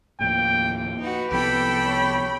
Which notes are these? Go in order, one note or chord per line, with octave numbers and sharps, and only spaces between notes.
D#2 A2 F3 G5
D#4 F#4 B4
C2 F3 B3 G4 A4 G5 B5
C#5